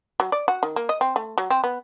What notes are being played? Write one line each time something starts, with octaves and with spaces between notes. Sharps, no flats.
F#3
D5
F#4
D#3
A#3
D#5
C4
A3
F#3
C4
B3